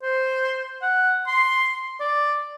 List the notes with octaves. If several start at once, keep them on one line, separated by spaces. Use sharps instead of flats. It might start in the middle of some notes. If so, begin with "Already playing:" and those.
C5
F#5
C6
D5